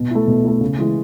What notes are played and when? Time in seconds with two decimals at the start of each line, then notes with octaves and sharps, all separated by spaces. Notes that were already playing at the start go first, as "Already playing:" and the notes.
Already playing: B2
0.11 A3 E4
0.27 B2
0.44 A3 E4
0.61 C#3
0.79 E3 G#3